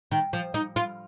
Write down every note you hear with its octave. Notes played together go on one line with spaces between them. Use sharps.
D#3
F3
D#4
F4